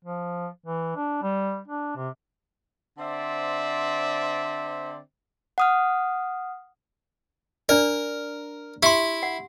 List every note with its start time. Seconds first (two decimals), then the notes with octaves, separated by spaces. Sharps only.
0.05 F3
0.66 E3
0.96 D4
1.22 G3
1.68 D4
1.96 C3
2.98 D3 C4 C5 D5 E5
5.58 F#5 D#6 F6
7.69 D4 A#4 D5
8.83 E4 G4 C6
9.23 F#5